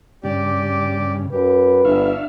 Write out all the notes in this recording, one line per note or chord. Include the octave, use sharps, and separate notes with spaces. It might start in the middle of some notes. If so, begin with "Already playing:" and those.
G2 C#3 G4 D5
F#2 G4 B4
G1 D4 E5 F5 C#6